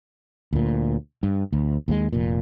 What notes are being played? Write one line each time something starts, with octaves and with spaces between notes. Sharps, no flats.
D2 A#2
G2
D2
D#2 B2 G#3
F1 A#2